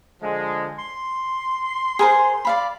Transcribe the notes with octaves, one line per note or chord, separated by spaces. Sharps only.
D3 F3 G#3
C6
G#4 A#4 C5
D5 F5 B5